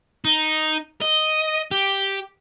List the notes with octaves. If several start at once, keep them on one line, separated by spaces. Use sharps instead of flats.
D#4
D#5
G4